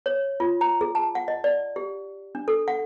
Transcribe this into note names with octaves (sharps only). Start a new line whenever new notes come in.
C#5
F4
A#5
G#4
A5
F#5
D#5
D5
G4
D4
A4
F#5